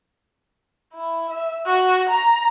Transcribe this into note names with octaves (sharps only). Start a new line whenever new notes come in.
E4
E5
F#4
A#5